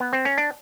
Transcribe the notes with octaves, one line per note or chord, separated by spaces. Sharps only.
B3
C4
C#4
D4